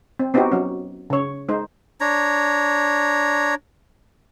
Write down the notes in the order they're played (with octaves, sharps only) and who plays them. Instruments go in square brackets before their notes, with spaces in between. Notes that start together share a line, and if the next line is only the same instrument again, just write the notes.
[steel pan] C4
B3 C4 D#4 E4 F#4 G4
F#3 C#4
C#3 C#5
G#3 D#4 C5
[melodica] D4 C#5 A#5